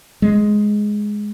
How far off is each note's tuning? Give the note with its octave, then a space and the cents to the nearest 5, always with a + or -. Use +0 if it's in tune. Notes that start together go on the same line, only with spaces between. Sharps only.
G#3 +5